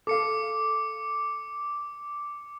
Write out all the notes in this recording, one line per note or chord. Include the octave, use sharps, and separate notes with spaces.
A4 F5 D6 C#7